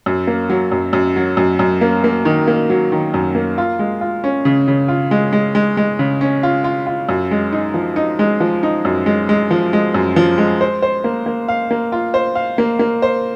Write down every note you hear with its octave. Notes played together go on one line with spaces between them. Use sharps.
F#2
A#3
F#3
F#2
F#2
F#3
F#2
F#2
A#3
A#3
D#3
A#3
F#3
D#3
F#2
A#3
F4
G#3
F4
C#4
C#3
C#3
F4
G#3
G#3
G#3
G#3
C#3
C#4
F4
F4
F4
F#2
G#3
D#4
F3
D#4
G#3
F3
D#4
F#2
G#3
G#3
F3
G#3
F#2
F3
G#3
C5
C5
A#3
A#3
F5
A#3
F4
C5
F5
A#3
A#3
C5